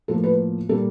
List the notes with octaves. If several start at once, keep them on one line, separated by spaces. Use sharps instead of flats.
A2 F3 A#3 A4
B4
A#2 G3 A#3 A4